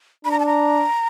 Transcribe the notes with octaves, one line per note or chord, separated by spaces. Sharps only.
D4 B5
A#5
A5
A#5